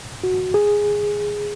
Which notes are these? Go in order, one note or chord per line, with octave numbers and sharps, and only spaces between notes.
F#4
G#4